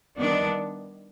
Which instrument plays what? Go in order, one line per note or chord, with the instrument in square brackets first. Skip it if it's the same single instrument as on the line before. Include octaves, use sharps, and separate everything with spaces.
[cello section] D#3 G3 B3 D4